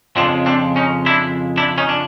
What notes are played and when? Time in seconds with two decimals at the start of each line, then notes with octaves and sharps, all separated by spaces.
0.16 F2 C#3 F3 G#3 C4 D4
0.46 C4 D4
0.76 C#4 D#4
1.06 D4 E4
1.57 D4 E4
1.78 C#4 D#4
1.89 D4